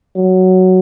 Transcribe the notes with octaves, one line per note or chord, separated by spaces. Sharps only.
F#3